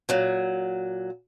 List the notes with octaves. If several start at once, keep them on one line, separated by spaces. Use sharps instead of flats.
A#2 F#3